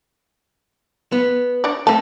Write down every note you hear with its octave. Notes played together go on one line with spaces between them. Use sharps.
B3
D4 C#5 D5
A3 C4 A5